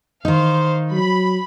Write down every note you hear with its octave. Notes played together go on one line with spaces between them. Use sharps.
D#3 D#4 C5 F5
F#3 B5